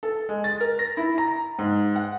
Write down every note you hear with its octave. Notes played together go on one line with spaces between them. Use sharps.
A4
G#3
A6
A#4
A#6
E4
A#5
G#2
F#5